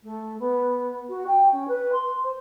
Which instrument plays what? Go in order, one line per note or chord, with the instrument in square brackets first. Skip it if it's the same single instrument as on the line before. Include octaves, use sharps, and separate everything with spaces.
[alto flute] A3
B3
F#4
G5
C#4
B4
C6
C5